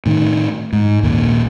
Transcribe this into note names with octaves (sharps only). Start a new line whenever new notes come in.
A2 D#3
G#2
A#1 D#2 A#2